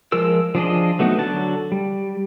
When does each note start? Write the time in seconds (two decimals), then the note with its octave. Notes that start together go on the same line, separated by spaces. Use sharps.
0.12 F3 G#3 F4 A#4 E6
0.55 F3 D4 G#4 D#5
0.99 F#3 A3 B3 D#4 F#4
1.18 D3 F#3 F#4 A5
1.72 G3